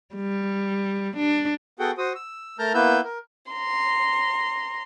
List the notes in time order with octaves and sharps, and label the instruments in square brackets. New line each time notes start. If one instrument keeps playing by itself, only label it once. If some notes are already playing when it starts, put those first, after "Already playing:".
[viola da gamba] G3
D4
[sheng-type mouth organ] B3 F#4 G#4 A4 F#5 G5
F#4 C5 D#6
E6
A3 A#4 A5 A#5 F6 G6
A#3 B3 E4 B4 E6 G6
A#4
[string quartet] A#5 C6